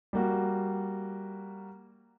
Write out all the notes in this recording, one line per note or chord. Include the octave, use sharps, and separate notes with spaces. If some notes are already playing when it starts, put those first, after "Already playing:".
G3 A#3 F#4